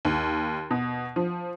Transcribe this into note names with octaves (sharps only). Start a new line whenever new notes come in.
D#2
B2
F3